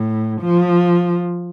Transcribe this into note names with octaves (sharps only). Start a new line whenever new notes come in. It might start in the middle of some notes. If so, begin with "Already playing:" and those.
Already playing: A2
F3